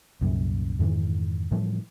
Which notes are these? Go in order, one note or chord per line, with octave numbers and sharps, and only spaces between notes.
C2 F#2 A#2
F2 G#2 D#3 E3
A2 E3 F3 G3